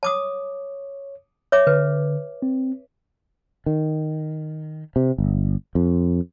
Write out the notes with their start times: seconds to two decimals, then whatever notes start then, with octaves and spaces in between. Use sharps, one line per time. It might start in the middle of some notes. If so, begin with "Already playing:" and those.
0.03 C#5 A5 D6 D#6
1.52 C#5 E5 D6
1.67 D3 B4
2.42 C4
3.66 D#3
4.96 C3
5.18 G1
5.75 F2